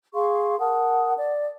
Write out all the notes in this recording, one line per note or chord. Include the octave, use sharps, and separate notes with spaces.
G#4 F5 C6 C#6
A#4 F#5 A5 D#6
D5